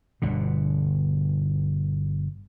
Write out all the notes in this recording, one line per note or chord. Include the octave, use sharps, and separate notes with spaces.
G1 B2 D3